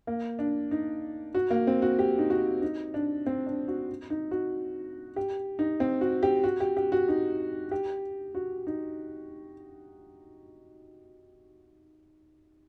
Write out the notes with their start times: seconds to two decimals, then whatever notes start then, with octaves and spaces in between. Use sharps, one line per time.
0.07 A#3
0.39 D4
0.71 D#4
1.34 F#4
1.50 A#3
1.67 C4
1.82 F#4
1.99 G4
2.19 D#4
2.30 F#4
2.62 D#4
2.94 D4
3.26 C4
3.46 D4
3.68 F#4
4.10 D#4
4.31 F#4
5.16 G4
5.59 D#4
5.80 C4
6.01 F#4
6.23 G4
6.44 F#4
6.60 G4
6.77 G4
6.92 F#4
7.08 D#4
7.71 G4
8.35 F#4
8.67 D#4